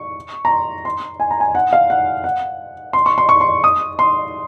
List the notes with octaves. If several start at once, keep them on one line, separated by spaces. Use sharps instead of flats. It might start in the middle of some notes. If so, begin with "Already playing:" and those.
Already playing: C#6
A#5
C6
C6
G#5
A#5
G#5
F#5
F5
F#5
F#5
C6
C#6
C6
C#6
C6
D#6
C6